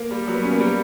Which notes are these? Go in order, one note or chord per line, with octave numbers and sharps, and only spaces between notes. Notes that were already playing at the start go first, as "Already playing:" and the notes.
Already playing: A#3
G3
F#3
B3
C#4
A#3
G3